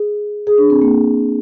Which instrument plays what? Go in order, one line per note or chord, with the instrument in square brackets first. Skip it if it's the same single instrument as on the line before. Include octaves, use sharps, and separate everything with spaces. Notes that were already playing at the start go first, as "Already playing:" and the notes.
Already playing: [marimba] G#4
G#4
D4
C4
A#3